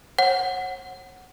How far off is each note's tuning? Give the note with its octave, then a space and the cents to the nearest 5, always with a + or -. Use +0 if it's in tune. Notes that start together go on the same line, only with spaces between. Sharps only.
C#5 -45 F#5 +0